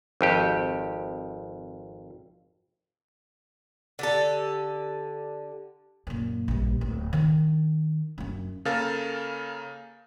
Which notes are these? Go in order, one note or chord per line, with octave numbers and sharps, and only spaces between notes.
G#1 F2 G4
D3 G4 A4
F#2 A#2
A#1 G2
D1
D#3 D4
F#2 D4
C#3 A#3 A4 A#4 F5 A6